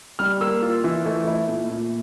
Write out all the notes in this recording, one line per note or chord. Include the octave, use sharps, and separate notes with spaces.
G3 F6
A#3 E6
F4
E3
A3
E4
A#2
A#2